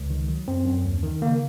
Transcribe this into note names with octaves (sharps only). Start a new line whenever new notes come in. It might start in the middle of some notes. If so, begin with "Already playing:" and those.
Already playing: C#2
D#3
F#3
F#2 C4
F#2
D#2
D#3
C#3 A#3